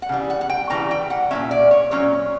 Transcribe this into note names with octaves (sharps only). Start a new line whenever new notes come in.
F#5
C#3 E3 G3
F#5
F#5
G5
C#3 E3 G3 A#5
G5
F#5
A#2 F#3 C#4 E5
D5
C#5
A#2 F#3 C#4 C#5